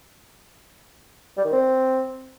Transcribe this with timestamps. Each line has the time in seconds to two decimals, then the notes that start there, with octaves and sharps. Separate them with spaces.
1.37 G3
1.45 D#3
1.52 C4